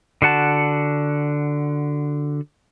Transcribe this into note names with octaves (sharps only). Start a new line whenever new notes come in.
D3 F#4 F#5 A5